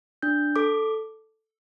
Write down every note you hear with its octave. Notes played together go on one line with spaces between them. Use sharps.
D4 G6
A4 D6